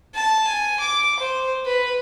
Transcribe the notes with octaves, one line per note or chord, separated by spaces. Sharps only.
A5
G#5
D6
C5
B4